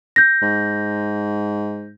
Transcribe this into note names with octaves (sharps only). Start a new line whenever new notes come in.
G6 A#6
G#2